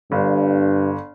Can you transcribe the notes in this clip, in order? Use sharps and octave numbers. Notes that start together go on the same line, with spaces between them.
G1 G2